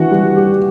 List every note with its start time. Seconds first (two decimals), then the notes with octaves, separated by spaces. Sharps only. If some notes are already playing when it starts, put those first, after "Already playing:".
Already playing: E3 D4 F#4
0.11 G3
0.35 G4